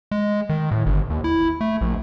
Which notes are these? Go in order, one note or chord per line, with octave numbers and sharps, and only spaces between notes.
G#3
D#3
A2
G1
D#2
E4
A3
A#1